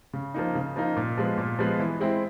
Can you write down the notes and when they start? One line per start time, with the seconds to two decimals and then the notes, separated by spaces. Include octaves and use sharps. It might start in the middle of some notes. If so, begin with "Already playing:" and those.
0.14 C#3
0.34 F3 A#3 D#4
0.55 C#3
0.76 F3 A#3 D#4
0.97 A#2
1.18 F3 G#3 B3
1.38 A#2
1.59 F3 G#3 B3
1.79 E3
2.00 G#3 C4 E4